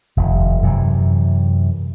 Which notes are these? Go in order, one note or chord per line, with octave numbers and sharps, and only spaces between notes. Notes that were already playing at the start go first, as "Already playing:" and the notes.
F1 D#2
F#2 C3 E3